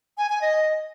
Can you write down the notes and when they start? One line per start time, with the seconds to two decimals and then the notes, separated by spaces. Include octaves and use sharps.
0.18 G#5
0.30 G#5
0.42 D#5